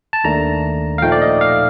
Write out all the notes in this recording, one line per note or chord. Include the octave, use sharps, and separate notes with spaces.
A5
D#2 D#3 A3 D4 A#5
F5
A#2 F3 A3 D#4 G5
D5
D#5
F5